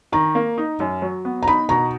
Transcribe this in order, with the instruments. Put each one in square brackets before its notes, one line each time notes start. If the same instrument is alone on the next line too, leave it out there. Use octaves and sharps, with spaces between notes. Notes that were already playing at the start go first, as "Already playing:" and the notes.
[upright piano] D#3 [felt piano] A#5
[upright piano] A#3
D#4
F#2
F#3
B3
[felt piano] A#5
[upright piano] D#4 [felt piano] B5
[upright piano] B2 [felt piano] A#5